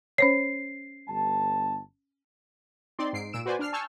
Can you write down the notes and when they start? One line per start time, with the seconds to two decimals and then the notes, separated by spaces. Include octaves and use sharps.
0.18 C#4 C5 C#5 C7
1.09 G1 A5
2.99 C4 D#4 D5 C6
3.13 G#2 C7 D7
3.33 A#2 E6 D7 E7
3.46 F#4 B4 C5 D5 G#5
3.59 D4 F6 C7
3.72 G#5 A5 C#6 E6 F6 G6